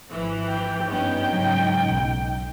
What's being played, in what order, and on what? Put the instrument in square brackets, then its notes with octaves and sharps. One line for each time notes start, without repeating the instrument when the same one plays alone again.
[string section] G#1 E3 F3
[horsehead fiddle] G5
[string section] G2 B3 C#4 [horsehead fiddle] D#4 G5
[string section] G#2 C#3 F#3
B1